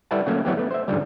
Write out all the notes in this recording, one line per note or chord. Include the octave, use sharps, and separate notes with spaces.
G3 E4 A4 B4 F#5 A5
F#3 A3 A#3 C#4 F#4
E3 F#3 B3 G4
A3 B3
C5 E5
G#2 D3 F3 G3